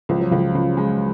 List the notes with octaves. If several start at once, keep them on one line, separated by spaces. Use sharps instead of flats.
C#2 F3
F#3
C#2 C#3 F3
C#2
G#3